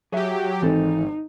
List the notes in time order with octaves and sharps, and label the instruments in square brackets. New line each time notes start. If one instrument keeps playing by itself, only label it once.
[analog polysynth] F#3 G4 [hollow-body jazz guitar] G#4 E5
[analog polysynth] G#1 [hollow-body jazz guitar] E3 C4 A4 [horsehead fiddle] D#4